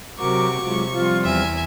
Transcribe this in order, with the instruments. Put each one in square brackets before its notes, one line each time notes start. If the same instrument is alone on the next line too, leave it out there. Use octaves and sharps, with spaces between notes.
[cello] C3 [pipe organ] F#3 A#4 [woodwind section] F#4 D6 [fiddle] C#6
[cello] C3 [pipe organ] F#3 G#3 F4
[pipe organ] F3 G3 C4 [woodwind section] F4
[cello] E2 [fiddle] E5 G#5